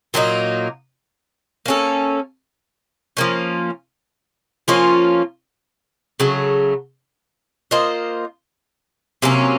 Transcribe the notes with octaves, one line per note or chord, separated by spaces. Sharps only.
A#2 F#3 A#3 D#4
A#3 C#4 A4
F3 A#3 C#4
F3 A#3 C#4 F4
C#3 F#3 A3
A#3 F4 C5 D#5
C3 F#3 A#3 C#4